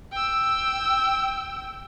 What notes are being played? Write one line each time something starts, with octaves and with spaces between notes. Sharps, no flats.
G5 E6